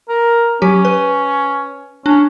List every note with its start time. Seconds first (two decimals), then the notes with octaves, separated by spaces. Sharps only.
0.09 A#4
0.62 F#3 C#4 G4
0.85 B4
2.06 C#4 D4